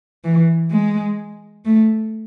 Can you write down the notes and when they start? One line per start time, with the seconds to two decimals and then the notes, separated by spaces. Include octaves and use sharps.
0.25 E3
0.71 G#3
1.65 A3